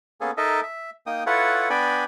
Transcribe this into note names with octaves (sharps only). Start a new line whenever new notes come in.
A#3 B3 C#4 G#4 A4
D#4 A4 A#4 D#5 E5
E5
A#3 D#4 G5 D#6
E4 F4 A4 B4 C#5 F#5
B3 D4 D5 G5 G#5 B5